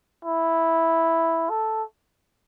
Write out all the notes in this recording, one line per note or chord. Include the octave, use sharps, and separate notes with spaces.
E4
A4